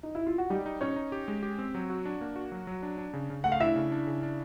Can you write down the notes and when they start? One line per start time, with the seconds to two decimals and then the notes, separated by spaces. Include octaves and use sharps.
0.03 D#4
0.15 E4
0.27 F4
0.38 F#4
0.50 G3 D#4 G4
0.66 D#4
0.81 C#4 D#4 C#5
0.96 D#4
1.12 G4
1.28 G#3
1.43 G4
1.59 C4
1.75 F#3
1.90 F#4
2.05 D4
2.21 A#3
2.36 F#4
2.52 F#3
2.67 F#3
2.83 D4
2.98 D4
3.13 C#3
3.30 C#3
3.44 A3 F#5
3.52 F5
3.60 D4 E4 E5
3.76 C#3
3.92 D4
4.07 C#3
4.23 D4